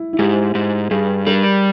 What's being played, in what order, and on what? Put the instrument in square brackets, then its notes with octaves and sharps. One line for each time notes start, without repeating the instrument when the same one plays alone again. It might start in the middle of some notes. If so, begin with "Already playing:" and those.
Already playing: [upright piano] E4
E4
[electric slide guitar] G#2 [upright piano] G4
[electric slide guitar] G#2
[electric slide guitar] G2 [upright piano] G#4
[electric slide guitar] G3 [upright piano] A#4